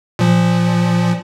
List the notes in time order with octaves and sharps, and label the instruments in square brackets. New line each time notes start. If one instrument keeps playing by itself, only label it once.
[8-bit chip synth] A#2 F3